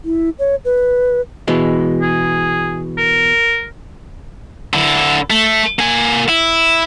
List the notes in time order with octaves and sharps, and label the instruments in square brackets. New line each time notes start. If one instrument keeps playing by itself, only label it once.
[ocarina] E4
C#5
B4
[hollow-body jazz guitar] B2 E3 G#3
[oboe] G#4
A#4
[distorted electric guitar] D3 E4
A3
A#3 G#5
E4